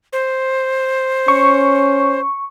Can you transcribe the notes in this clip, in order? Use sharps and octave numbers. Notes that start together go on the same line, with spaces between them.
C5
C#4 C#6